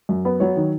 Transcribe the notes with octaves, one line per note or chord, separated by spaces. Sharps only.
F#2
B3
F#3 C#5
D#3